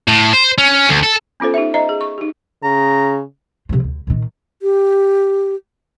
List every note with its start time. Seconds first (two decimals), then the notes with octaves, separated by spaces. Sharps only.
0.08 A2
0.33 C5
0.58 C#4
0.89 D2
1.03 A4
1.40 B3 C#4 F4 A4 C5
1.54 D#4 G4 C5 E5
1.74 C5 D#5 E5 A#5
1.89 G#4
2.01 C#6
2.18 D#4 G4
2.63 C#3 A#5
3.69 C3 F3
3.84 D2
4.07 A#2 D#3
4.62 G4